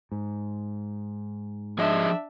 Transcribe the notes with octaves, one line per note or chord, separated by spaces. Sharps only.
G#2
F3 D4 G#4 D#5 E5